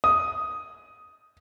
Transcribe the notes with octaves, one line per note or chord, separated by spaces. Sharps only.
D#6